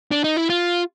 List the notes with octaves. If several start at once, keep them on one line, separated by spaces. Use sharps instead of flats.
D4
D#4
E4
F4